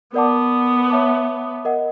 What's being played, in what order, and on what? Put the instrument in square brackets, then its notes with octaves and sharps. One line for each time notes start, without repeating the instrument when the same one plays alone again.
[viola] B3 [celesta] A#4 D5 F#5 A5 D6
[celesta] C#5 E5 A5 D6
A#4 D#5 F#5